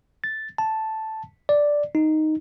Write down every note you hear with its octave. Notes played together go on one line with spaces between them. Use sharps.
A6
A5
D5
D#4